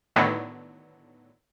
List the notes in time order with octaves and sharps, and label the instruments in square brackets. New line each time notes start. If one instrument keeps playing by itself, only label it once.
[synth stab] A2 D3 D#3 F#3 A3 B3